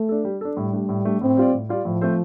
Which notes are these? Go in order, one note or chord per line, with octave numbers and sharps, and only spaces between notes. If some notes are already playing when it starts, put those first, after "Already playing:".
Already playing: A3
D4 A4
G3
D4 A4
A2 G3
A3 D4
A2
A3 D4
A2 C4
G3 F4 D5
A2
G3 F4 D5
A2 F3
A3 C4 A4 C5